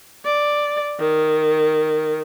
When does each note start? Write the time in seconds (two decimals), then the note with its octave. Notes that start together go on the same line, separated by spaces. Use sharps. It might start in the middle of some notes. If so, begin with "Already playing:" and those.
0.25 D5
1.00 D#3